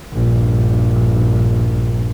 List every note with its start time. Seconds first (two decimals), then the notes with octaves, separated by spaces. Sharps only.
0.13 A#1 G2